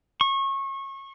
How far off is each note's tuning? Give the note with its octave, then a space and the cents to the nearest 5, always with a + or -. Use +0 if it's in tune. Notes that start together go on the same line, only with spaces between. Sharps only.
C#6 -30